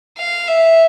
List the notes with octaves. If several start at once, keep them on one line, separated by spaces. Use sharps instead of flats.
F5
E5